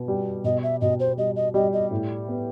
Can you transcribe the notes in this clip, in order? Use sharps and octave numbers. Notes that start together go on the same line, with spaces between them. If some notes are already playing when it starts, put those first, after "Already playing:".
Already playing: B2 B3
G3
B2 D#5
E5
B2 D#5
C5
G3 D#5
D#5
G3 D#5
D#5
A2
B3